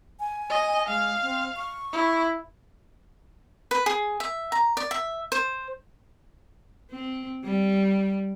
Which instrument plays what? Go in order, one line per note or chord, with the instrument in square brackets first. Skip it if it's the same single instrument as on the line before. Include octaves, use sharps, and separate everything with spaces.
[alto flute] G#5
[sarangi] D#5
[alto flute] G#3 [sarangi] F5
[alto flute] C4
C#6
[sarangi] E4
[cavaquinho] B4
G#4
E5
A#5
D5
E5
C5
[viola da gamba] C4
G3